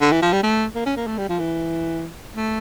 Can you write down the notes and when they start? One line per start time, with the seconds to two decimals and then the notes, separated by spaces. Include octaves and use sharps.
0.01 D3
0.12 E3
0.22 F3
0.33 G3
0.43 A3
0.75 A#3
0.86 C#4
0.96 A#3
1.07 A3
1.18 G3
1.29 F3
1.39 E3
2.35 A3